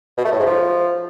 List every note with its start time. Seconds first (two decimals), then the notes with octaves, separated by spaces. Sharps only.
0.18 B2
0.25 A3
0.32 A2
0.39 G#2
0.47 F3